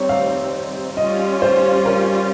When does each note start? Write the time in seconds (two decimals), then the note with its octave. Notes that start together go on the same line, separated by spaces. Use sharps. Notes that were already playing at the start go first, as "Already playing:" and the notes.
Already playing: G3 C4 D#4 C#5
0.09 F5
0.97 G3 C#4 F4 D#5
1.42 C5
1.85 A#4